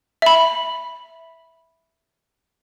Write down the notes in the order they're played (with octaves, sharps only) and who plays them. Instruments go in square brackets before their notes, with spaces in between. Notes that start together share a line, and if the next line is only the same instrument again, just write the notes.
[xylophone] E5 B5